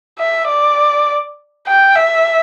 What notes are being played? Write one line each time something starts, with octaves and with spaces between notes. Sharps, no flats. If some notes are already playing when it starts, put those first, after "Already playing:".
E5
D5
G5
E5